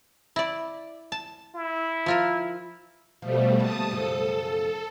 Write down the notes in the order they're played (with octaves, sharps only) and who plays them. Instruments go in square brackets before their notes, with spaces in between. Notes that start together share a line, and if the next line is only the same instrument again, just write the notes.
[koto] E4 D5
A5
[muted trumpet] E4
[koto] F3 F4 A#4
[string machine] B2 G3 A3 [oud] F3
[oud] D3 G3 A#3 [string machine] A5 D#6
[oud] F#2 C#3 F3 [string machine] A4